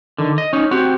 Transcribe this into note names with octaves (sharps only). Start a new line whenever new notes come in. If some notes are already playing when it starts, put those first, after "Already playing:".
D3 D#3
D#5
C#4 D#4
C4 F#4 G4